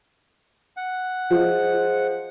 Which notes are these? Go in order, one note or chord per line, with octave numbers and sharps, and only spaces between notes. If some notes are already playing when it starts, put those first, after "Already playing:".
F#5
F3 G#4 C5 D#5